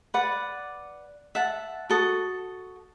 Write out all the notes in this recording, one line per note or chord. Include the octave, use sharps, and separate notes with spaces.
B4 D5 F#5
E5 F#5 A5
F#4 A4 D#6